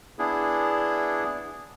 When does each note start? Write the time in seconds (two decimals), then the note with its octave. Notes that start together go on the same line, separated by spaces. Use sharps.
0.19 B3 D4 E4 G#4